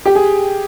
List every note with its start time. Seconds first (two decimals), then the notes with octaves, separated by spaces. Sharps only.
0.05 G4
0.15 G#4